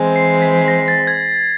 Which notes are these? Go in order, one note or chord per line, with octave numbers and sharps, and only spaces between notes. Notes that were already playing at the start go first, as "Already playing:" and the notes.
Already playing: E3 G#3 C4
C7
B6
A#6
A6
G#6